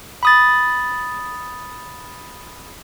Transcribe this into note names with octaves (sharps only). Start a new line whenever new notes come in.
B5 D#6 A6